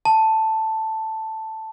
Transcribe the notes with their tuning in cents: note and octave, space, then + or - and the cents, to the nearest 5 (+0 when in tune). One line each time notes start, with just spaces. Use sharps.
A5 +5